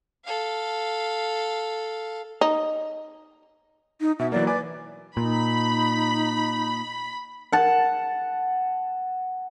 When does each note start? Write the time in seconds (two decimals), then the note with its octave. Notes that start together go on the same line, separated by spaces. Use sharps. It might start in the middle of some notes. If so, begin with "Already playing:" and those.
0.25 A4 F5
2.41 D#4
4.01 D#4
4.19 B2 E5
4.32 E3 F#3 A#3 D5
4.47 B4 D5 G#5 D6
5.17 A#2 D#4 B5
7.52 F#5 A5